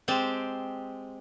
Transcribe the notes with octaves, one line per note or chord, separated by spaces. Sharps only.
G#3 C4 G4 A5